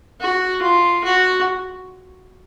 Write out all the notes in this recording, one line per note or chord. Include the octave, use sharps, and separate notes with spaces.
F#4
F4
F#4